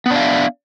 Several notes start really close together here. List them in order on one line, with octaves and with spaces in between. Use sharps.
B3 D4 F5 E5